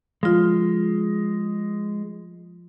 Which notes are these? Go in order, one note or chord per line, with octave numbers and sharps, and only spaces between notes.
F3 G#3 F4